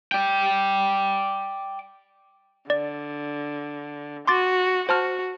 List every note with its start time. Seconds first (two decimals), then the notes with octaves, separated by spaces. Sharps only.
0.12 D5 G5
2.70 D3 D5
4.28 F#4 C6 D6 A6
4.89 F#4 C5 A5 F6